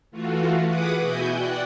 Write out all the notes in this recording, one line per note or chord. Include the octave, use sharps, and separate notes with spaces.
E3 A3 F4 F#4
G#4 B4 F#5 B5 D6 D#6
B2 E4 F#4 G#5 G6
D5 F#5 G5